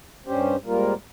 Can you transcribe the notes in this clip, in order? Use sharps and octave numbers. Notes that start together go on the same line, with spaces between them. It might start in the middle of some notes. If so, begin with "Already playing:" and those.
G2 G3 C#4 G4 C5
G#2 G3 A#3 F4 A#4